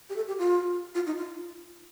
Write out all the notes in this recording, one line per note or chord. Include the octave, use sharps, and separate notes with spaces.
G4
A4
G4
F4
F4
D#4
F4